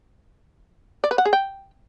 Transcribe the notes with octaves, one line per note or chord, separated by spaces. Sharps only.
D5
B4
F#5
G#4
G5